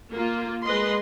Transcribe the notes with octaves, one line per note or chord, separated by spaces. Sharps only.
A#3 F4
G#3 B4 D#5 C6